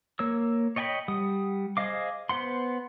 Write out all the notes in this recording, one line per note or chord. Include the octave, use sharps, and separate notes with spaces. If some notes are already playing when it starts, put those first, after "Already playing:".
A#3 C#5 E6
C#5 D#5 G5 G#5 B5
G3 F#5 D#6
G#4 C5 D#5 F5 D6
B3 C5 F#5 C6